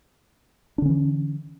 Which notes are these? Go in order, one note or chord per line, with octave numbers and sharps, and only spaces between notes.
D3 E3 C#4 D4